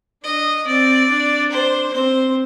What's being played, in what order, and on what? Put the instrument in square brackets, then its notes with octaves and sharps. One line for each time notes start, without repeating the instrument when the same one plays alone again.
[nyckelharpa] D4 [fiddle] D#5
[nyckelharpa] C4 [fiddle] D5
[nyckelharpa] D4
[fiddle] C5
[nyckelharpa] C4 [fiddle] C5